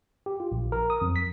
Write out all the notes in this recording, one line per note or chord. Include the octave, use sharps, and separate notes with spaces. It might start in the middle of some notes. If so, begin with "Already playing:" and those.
G4
F4
A#1
A#4
D#6
F2
B6